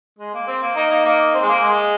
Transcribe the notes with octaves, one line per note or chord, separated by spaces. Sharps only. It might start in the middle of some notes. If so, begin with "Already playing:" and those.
G#3
A#3
C4
A#3
A#3 D#4
A#3 D#4
A#3 D#4
C4
G#3
A#3
G#3